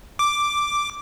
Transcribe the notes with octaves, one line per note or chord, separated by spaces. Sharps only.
D6